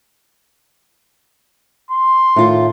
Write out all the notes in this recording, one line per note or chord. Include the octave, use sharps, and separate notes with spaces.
C6
A2 D#3 F4